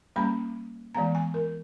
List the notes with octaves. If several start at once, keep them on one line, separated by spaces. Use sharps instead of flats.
G3 A#3 C#4 B5
E3 G#3 B3 A#5
G#5
A#4